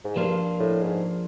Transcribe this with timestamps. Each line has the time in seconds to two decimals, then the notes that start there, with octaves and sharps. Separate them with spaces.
0.04 G#2
0.16 G2 F3 A#3 D4 F4
0.60 A2
0.82 G#2